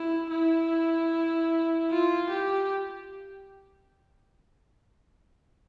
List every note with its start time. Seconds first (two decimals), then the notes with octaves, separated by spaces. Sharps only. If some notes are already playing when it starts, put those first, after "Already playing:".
Already playing: E4
0.30 E4
1.90 F4
2.30 G4